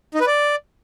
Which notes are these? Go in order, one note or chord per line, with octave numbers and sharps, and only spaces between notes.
D#4
B4
D5